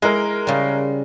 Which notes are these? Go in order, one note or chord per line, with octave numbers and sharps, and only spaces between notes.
G#3 E4 A#4
C#3 G3